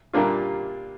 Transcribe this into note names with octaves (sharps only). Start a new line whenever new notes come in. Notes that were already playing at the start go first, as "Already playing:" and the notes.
A#2 G3 A#3 D4 F4